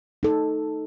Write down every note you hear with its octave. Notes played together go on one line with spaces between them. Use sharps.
D#4 A4